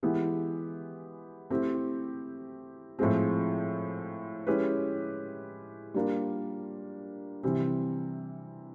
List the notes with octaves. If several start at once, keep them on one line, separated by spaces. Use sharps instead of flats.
E3 G#3 B3 E4 G4
A3 C4 E4 G4
A2 F3 G#3 C4
G#3 C#4 E4 G4 B4
G3 A#3 D4 F4 A#4
C3 E3 G3 C4